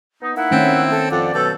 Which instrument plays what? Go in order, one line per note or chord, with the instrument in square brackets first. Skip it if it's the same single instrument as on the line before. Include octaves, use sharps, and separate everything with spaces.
[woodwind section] B3 D#4
[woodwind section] A#3 D#4 E4 [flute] F#5
[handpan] D#3 A3 C#4 [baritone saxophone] C4
[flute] A4
[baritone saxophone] F2 [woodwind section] A4 C5 D5 [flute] F#5
[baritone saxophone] B2 [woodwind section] F#3 A4 [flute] G6